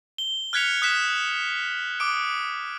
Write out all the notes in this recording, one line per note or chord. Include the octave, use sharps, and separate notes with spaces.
G7
F6 F#6 G#6 B6 C#7 F7
D#6 F#6 B6 E7
D6 D#6 D7